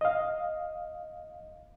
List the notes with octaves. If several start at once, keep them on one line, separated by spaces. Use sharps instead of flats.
D#5 F5